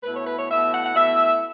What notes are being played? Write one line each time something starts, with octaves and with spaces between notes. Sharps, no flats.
B2 A3 E4 B4
C#5
B4
C#5
B2 A3 E4 E5
F#5
F#5
B2 A3 E4 E5